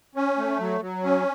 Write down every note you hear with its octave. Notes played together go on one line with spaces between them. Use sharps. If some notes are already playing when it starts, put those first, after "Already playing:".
C#4
A3
F#3
F#3
C#4